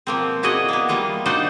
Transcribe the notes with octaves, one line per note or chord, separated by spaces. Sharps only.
B2 F3 A#3 C4
E4 F#4 G#4 D5 D#5
A#3 B3
G3 A#3 F4 D#5
D4 D#4 F#4 C5 D5 D#5